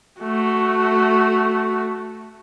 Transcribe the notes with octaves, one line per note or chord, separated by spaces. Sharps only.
A3 F#4